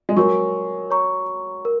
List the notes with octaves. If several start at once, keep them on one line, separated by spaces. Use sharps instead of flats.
G#3
F#3 A#4 C#5 G#5 C#6
C#5 A#5 C#6
A#4